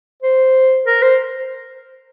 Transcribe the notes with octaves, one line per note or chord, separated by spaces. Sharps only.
C5
A#4
C5